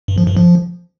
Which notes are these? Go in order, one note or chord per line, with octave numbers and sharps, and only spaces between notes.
G2
F3
G2
F3